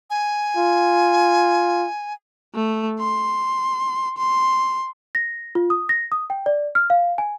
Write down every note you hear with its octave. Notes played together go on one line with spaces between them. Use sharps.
G#5
F4
A3
C6
C6
A#6
F4
D#6
A#6
D#6
G5
D5
F6
F5
G#5